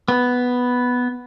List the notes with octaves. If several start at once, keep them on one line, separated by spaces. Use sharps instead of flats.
B3